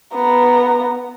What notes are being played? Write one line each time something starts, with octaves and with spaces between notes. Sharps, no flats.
B3 A#5